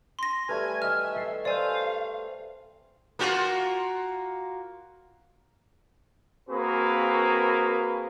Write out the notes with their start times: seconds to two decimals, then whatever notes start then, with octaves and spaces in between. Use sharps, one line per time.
0.19 C6 A#6
0.49 G3 A3 B4 G#5 F6
0.82 D#5 E5 G#5 F6
1.16 A4 C7
1.45 C5 D5 F5 G#5 E6 G6
3.19 A#3 F4 F#4
6.49 A#3 C4 F#4 G#4 A#4 B4